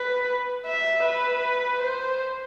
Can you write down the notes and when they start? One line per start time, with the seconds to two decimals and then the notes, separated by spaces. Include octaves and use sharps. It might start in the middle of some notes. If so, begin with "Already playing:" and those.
Already playing: B4
0.67 E5
1.04 B4
1.81 C5